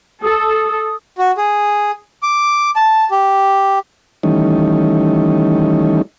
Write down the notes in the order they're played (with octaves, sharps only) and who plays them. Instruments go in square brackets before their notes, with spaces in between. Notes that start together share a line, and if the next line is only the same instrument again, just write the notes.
[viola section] A4 [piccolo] D#6
[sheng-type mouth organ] F#4
G#4
D6
A5
G4
[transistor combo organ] D#3 E3 G3 A3 C#4 D#4